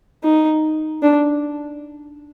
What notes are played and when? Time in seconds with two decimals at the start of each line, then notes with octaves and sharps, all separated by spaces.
0.24 D#4
1.03 D4